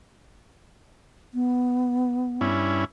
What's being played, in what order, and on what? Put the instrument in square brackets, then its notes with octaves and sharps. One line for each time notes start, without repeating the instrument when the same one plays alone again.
[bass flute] B3
[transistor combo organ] G2 C#4 E4